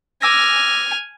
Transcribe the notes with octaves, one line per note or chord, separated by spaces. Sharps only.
G#5 D6 E6 F6 A#6